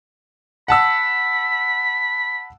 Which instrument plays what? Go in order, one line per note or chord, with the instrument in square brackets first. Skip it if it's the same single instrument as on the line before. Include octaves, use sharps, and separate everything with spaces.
[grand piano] F#5 A5 E6 [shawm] B5